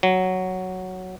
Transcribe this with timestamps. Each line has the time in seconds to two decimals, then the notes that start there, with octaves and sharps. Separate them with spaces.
0.03 F#3